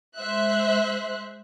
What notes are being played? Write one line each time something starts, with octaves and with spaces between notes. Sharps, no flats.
G#3 C5 E5 F#6